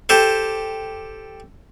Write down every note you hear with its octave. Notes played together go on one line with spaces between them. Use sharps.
G4 A4 C5